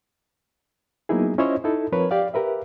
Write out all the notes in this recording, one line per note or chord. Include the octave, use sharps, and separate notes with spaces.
F#3 A#3 B3 D#4 E4 G#4
C#4 E4 F4 C5 C#5 D#5
D#4 E4 A4
F3 C4 A#4 B4 C#5
G4 D5 F5
G4 A#4 B4 E5